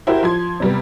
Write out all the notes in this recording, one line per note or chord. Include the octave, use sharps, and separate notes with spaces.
E4 F#4 G4 A#4 C5
F3 C6 G#6
C3 G3 B3